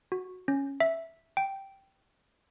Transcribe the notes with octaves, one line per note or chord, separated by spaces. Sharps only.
F#4
C#4
E5
G5